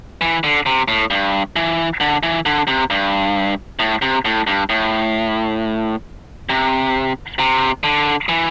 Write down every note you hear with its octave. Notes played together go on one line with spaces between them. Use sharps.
E3
D3
C3
A2
G2
E3
D3
E3
D3
C3
G2
A2
C3
A2
G2
A2
C3
C3
D3
E3